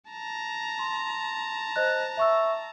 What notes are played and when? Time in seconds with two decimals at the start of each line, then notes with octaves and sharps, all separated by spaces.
0.10 A5 A#5
0.79 C6
1.76 C5 D#5 F#6
2.17 E5 C#6 E6